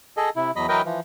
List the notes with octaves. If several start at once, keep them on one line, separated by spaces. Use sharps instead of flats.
G#4 A4 D#5
C3 E4
E2 F#3 D#5 B5
E3 F#3 A#4 B4 D#5 G5
E3 F3